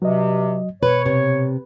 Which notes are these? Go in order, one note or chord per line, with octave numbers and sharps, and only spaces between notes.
G2 C3 F#3 D#5
B2 B4 C#5
C3